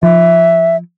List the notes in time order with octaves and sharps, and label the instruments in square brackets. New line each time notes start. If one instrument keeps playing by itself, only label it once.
[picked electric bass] F3 [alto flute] E5